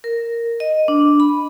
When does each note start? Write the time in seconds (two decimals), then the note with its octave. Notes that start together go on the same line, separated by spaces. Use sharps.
0.04 A#4
0.60 D#5
0.88 D4
1.20 B5